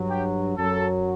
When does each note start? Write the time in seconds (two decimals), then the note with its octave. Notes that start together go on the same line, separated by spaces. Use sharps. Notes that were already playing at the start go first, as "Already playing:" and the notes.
Already playing: G2 F#3
0.09 G4
0.58 F#2 F#3 A4